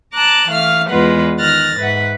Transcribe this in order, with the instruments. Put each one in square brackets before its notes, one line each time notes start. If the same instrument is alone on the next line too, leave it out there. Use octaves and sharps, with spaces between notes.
[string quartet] A5 A#5 D6 F#6
E3 A3 F5 F6
E2 G#3 B3 F4 B4 F#5
D#3 F6 F#6 A6 A#6
G#2 B4 E5 F#5